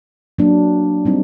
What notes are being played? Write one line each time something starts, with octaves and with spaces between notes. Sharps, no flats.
F#3 A#3 D4
G3 C4 D#4